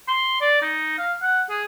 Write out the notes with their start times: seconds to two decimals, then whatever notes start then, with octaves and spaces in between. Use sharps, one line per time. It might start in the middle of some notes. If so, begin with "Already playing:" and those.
0.08 C6
0.41 D5
0.62 D#4
0.98 F5
1.22 F#5
1.50 G#4